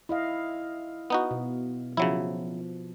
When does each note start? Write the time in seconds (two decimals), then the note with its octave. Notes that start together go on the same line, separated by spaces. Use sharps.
0.09 E4 D#5 F5
1.10 B3 D#4 F#4
1.31 B2
1.97 C#3 F3 F#3 E4